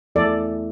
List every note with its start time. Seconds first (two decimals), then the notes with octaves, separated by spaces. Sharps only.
0.15 E2 E3 A3 A4 D5